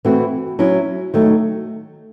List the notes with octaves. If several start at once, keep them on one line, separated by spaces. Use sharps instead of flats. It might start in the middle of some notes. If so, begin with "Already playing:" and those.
E3 A3 C4 F#4
F#3 C#4 E4
D#3 F#3 A3